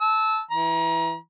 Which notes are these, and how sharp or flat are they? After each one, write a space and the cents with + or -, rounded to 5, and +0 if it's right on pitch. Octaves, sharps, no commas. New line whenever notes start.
A5 -10 E6 -20
E3 +0 A#5 +35